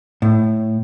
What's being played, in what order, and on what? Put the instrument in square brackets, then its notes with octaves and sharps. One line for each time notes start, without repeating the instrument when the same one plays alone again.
[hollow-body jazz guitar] A2